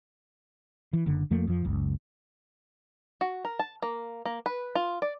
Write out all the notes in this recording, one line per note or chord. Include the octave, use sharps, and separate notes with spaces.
E3
F#1 D3
F2 F3 A3 A#3
F2 F3
F#1 C#2
F#4
A#4
A5
A#3
A#3
B4
F4
D5